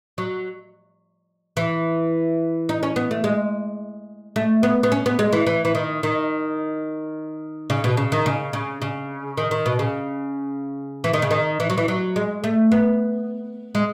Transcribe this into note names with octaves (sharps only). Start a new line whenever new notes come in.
F#3
E3
D#4
C#4
B3
A3
G#3
A3
B3
B3
C#4
B3
G#3
E3
E3
E3
D#3
D#3
C#3
B2
C#3
D#3
C#3
C#3
C#3
D#3
D#3
B2
C#3
E3
D#3
C#3
D#3
E3
F#3
E3
F#3
G#3
A3
B3
G#3